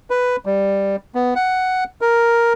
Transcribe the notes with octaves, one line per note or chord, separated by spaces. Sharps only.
B4
G3
B3
F#5
A#4